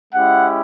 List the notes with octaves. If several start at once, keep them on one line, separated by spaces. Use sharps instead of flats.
G#3 C#4 E4 G4 F#5